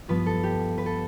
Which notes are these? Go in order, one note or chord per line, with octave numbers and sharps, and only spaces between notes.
G2 F3 B3 B4
A4
G4
B4
A4